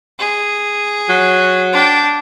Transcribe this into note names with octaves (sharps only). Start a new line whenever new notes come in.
G#4
F#3
D4 G5